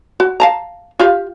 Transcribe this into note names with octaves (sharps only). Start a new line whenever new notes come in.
F#4
F5 A5 A#5
F4 G4 F5